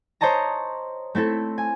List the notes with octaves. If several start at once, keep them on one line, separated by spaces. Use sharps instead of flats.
C5 C#5 D#5 A5 A#5
A3 C4 E4 A4
G#5